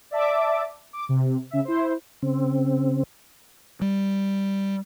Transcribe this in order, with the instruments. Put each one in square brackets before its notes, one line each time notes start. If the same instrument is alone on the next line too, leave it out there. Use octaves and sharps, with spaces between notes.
[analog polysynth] D5 E5 A5 D6
D6
C3
C#3 E5
E4 C5
[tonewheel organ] C#3 C4
[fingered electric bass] G3